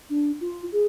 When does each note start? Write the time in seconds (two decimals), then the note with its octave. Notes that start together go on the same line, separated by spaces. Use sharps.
0.10 D4
0.41 F4
0.72 G#4